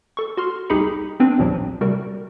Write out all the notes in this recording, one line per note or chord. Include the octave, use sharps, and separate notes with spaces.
A4 C#6
F#4 C6 F6
C2 D#4 G4 G#4 B5 C#7
B3 C4 D4 B4
A#1 D#2 A#2 F3 F#3
C3 G3 F#4 A#4